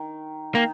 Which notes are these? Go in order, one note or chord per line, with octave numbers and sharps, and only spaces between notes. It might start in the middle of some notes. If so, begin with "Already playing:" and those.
Already playing: D#3
D#3 A#3